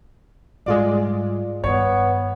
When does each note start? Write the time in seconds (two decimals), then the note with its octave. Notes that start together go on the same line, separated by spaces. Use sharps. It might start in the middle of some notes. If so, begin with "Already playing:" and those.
0.66 G#2 G3 G#3 F4 D5
1.64 G2 D#3 B3 C#5